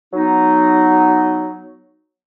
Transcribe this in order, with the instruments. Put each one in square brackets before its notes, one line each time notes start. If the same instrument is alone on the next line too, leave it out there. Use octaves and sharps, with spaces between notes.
[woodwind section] F#3 B3 D#4